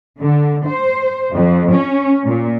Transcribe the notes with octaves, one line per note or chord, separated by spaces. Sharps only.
D3
C5
F2
C#4
A#2